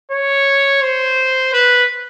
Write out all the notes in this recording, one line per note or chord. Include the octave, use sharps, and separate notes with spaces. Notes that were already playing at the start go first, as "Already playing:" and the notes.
C#5
C5
B4